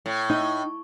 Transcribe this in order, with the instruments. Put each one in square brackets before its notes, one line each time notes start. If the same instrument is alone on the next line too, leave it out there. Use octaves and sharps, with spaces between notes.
[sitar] A2
[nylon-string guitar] D#4